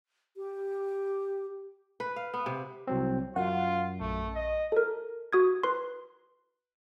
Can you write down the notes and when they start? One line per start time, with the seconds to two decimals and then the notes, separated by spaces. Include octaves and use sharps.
0.37 G4
2.00 B4
2.16 F5
2.34 B3
2.46 C3
2.87 C2 F#3 C4
3.36 F#2 F4 F#5
4.00 A#1 A3
4.35 D#5
4.72 A4 A#4
5.33 F#4 D#6 G#6
5.63 B4 C6